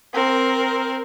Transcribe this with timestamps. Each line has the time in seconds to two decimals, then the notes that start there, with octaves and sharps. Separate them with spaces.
0.14 C4 A#4